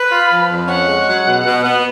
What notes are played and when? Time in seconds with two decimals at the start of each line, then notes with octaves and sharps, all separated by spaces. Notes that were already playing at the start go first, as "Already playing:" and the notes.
Already playing: B4 B5
0.10 F4
0.30 F3
0.48 F2
0.68 C#4 F#5
0.87 G#3
1.06 F#3
1.26 B2
1.45 B2
1.64 B3